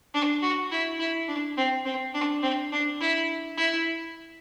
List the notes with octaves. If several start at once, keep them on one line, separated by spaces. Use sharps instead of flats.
D4
F#4
E4
E4
D4
C4
C4
D4
C4
D4
E4
E4